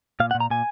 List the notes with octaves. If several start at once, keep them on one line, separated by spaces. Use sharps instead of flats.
A#2 F5
F#5
A#2
A#5
A#2 G#5